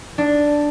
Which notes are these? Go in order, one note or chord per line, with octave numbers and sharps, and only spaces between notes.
D4